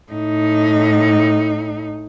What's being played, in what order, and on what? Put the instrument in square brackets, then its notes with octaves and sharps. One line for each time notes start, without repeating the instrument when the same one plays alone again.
[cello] A2 D#4